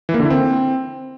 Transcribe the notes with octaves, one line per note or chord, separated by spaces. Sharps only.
E3
A#3
D3
E4
C4